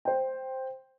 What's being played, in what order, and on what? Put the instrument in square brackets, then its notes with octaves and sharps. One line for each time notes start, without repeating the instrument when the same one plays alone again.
[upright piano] C5 G5